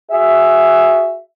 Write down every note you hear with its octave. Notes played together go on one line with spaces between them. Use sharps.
F#4 G#4 E5